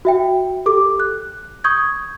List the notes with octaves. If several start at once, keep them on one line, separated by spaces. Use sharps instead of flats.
F#4 E5 G5
G4 A4 D6
F#6
C#6 D#6 G6 G#6